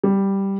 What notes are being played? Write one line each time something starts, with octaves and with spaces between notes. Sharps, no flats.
G3